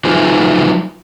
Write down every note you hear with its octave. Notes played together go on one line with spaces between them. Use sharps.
F#3 D#4 F4 G#4 B4 C5